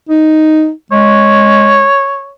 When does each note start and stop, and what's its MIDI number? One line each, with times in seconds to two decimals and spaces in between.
0.09 0.71 63
0.92 1.88 56
0.92 2.32 73